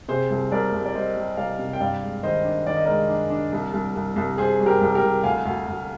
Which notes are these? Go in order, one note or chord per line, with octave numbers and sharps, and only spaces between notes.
C3 G#4 C5
C2
C2 A#4 D5
C2
D5
G3 C5 D#5
G3
C2 D5 F5
C3
G5
G2 D5 F5
G#3
D#3 C5 D#5
D4
D#3 D5
D#5
G#3 A#4 D5
D4
D4
C2
C2
C2
C2
C2 G#4 C5
G3
G4 A#4
C2
G4 A#4
C2
D2 F5 G#5
D2
D2